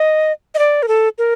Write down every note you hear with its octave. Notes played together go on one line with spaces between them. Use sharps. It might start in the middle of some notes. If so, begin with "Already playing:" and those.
Already playing: D#5
D#5
D5
A#4
A4
A#4